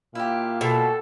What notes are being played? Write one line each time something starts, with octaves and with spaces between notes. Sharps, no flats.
A#2 E4 G4 F5
B2 A4